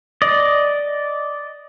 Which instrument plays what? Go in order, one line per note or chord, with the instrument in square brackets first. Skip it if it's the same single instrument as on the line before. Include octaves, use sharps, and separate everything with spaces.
[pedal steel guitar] D5 D#5